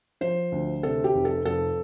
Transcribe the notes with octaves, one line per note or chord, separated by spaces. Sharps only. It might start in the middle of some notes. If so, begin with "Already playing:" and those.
F3 C5
D2
C3 A4
G4
F1
A4
F2 A4